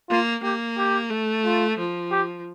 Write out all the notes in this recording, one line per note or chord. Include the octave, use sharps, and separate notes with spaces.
A#3 F4
A#3 G4
G4
A3
F4
F3
G4